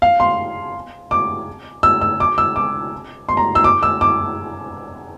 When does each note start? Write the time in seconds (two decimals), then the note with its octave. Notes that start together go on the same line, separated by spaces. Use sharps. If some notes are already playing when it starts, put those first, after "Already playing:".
0.02 F5
0.20 C6
1.11 D6
1.83 E6
2.01 E6
2.20 D6
2.38 E6
2.56 D6
3.29 C6
3.37 A#5
3.55 E6
3.64 D6
3.83 E6
4.01 D6